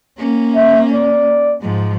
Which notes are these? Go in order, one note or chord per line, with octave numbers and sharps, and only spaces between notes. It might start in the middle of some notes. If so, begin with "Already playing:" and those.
A#3 C#4
E5
D5
G#2 F3